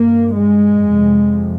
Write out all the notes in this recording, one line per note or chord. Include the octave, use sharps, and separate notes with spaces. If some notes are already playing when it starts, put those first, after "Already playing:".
Already playing: G2 A#3
G#3
F2 C3